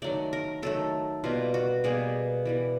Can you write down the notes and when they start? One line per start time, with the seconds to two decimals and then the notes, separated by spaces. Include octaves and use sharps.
0.02 D#3 F#3 A3 D5
0.33 A#4
0.62 D#3 F#3 A3 A4
1.24 B2 G3 A#3 F4
1.54 F#4
1.84 B2 G3 A#3 G#4
2.45 E3 G3 B3